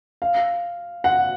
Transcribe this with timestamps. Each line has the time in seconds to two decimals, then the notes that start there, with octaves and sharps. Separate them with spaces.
0.22 F5
1.04 F#5